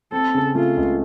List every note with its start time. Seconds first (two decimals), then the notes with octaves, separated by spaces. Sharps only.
0.12 C4 A4
0.34 C#3
0.55 A3 F4
0.77 C#2